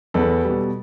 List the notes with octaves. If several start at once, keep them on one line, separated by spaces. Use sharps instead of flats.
E2 A4 B4
B2 G3